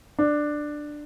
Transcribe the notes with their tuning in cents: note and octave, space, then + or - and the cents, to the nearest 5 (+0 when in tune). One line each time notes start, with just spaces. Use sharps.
D4 +10